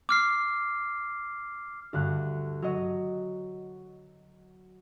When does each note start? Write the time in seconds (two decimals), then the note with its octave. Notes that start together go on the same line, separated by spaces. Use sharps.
0.09 D6 F6 C7
1.93 D2 G2 F#6
2.62 F#3 D#5